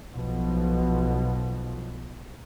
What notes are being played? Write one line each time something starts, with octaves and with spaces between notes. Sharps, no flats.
B1 B2 F3